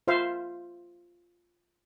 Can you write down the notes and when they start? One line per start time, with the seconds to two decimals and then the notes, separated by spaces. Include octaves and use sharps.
0.07 F4 C5 E5 F5